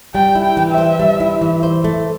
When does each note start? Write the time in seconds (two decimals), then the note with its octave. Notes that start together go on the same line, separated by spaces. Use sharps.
0.14 G3 G5
0.35 E4
0.42 G5
0.57 E3
0.71 E5
0.78 C5
0.99 G3
1.20 E4
1.41 E3
1.63 C5
1.84 A3